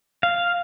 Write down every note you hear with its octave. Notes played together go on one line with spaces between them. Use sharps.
F5